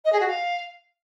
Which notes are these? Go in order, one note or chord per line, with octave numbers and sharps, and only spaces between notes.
D#5
G#4
F#4
F5